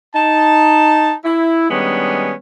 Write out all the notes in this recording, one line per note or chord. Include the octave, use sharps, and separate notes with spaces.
D#4 A5
E4
D#3 G3 G#3 B3 C#4 D4